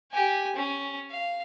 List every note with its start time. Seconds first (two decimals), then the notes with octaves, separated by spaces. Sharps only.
0.11 G4 G#5
0.56 C#4
1.10 F5